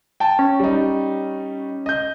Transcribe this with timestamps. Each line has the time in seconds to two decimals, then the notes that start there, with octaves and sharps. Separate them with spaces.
0.20 G5 A5
0.39 C#4
0.60 G3 D#4
1.86 D#5 G6